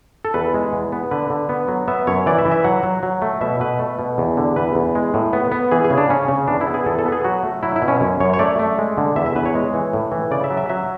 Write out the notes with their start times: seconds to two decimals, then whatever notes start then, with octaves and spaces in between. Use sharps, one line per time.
0.25 A4
0.34 E2 B4
0.54 G#3
0.73 E2
0.92 B3
1.11 D3 B4
1.30 D3
1.49 B3
1.68 F#3
1.88 B3 E5
2.07 F#2 C#5
2.26 E3 D5
2.38 E5
2.45 E3
2.52 E5
2.64 F#3 F#5
2.83 F#3
3.03 F#3
3.22 A3
3.41 B2 E5
3.60 B2 B4
3.79 A3
3.99 B2
4.18 E2
4.37 D3
4.56 E2 B4
4.75 E2
4.95 G#3
5.14 A2
5.33 B3
5.52 B3
5.71 E3 G#4
5.84 G#4
5.90 C#3
5.97 D4
6.09 C#3 C#4
6.28 C#3
6.48 E2 D4
6.61 E4
6.67 B3
6.74 G#4
6.86 E2 A4
6.99 A4
7.05 B3
7.12 G#4
7.24 F#3 F#4
7.43 A3
7.63 F#3 E4
7.76 E4
7.82 B2
7.88 C#4
8.01 F#2
8.20 F#2 C#5
8.34 C#5
8.39 A3 D5
8.59 A3
8.79 G#3
8.98 D3
9.16 E2 E5
9.26 E5
9.35 E2 B4
9.46 C#5
9.55 G#3
9.74 E3
9.93 A2
10.12 E3
10.31 C#3 D5
10.44 E5
10.50 F#3
10.57 E5
10.69 F#3 E5